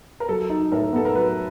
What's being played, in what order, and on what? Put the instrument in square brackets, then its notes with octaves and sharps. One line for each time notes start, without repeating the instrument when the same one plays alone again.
[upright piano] A#4
[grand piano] F#3 [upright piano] A4
[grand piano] D#4
[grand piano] A2 [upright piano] A#4
[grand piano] B3 [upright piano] A4
[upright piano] A#4
[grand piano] F#3 [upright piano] B4